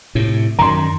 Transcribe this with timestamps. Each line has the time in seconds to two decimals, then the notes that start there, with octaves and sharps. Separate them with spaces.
0.15 A2 C3
0.59 F#2 D#3 A#5 C6